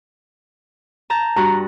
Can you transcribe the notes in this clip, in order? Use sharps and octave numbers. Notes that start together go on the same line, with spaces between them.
A5 A#5 G6
G2 F#4 A#5